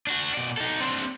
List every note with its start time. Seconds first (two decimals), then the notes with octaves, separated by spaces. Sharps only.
0.07 D4 F#4
0.34 B2 D5
0.57 D#4 A4
0.81 C4 D4